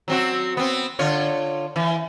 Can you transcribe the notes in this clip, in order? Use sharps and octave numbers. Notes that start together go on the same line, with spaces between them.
F#3 C4 F#4
B3 C4
D3 F4 C#5
E3